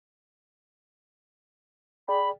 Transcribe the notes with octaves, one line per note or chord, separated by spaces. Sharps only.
G#4 D5 G5 B5